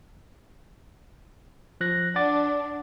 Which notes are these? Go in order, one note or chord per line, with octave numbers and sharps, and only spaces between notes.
F3 F#6 A#6
D4 F#5 D6 A6